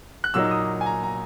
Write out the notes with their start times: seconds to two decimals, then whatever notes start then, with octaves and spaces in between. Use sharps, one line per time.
0.24 F#6
0.34 A#2 F#3 A#3 D#4 E6
0.44 E6
0.51 D#6
0.81 G#5
0.86 A#5
1.03 A#5